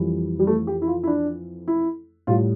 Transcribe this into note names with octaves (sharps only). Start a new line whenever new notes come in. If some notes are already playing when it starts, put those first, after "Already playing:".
Already playing: F2 E3 G3
G3
A3
G4
E4
F4
E4
D4
E4
A2 G3 F4